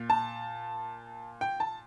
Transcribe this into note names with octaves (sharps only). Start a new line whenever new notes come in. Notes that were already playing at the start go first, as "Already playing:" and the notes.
Already playing: A#2
A5
G5
A5